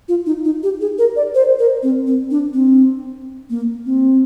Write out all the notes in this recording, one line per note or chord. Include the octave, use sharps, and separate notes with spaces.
F4
D#4
D#4
G4
G#4
A#4
D5
C5
A#4
C4
C4
D4
C4
A#3
C4